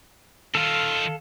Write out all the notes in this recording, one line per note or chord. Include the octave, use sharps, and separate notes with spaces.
D#3 F4 A4 F5